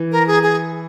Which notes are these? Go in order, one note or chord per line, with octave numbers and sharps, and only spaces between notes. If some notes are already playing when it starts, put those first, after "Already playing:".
Already playing: E3
A#4
G#4
G#4